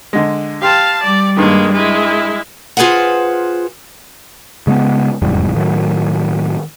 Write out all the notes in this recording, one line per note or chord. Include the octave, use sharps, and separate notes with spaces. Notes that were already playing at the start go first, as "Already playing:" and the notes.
D3 G#3
G4 F5 A5 C6
G3 D5
G2 D#3 G#3 A#3
G#3 E4
F4 G#4 B4 C5 F#5
C#3 G#3 A#3 B3
F1 E2 G#2 G3
A2 D#3 F#3